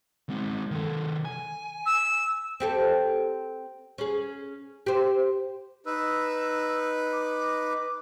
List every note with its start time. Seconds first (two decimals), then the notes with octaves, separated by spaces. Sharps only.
0.29 G#3 C4
0.71 D#3 A4
1.25 G#5
1.86 E6
2.60 C4 G4 A4
3.98 C#4 G#4
4.86 G4 C5
5.86 D#4 B4 E6
7.13 D6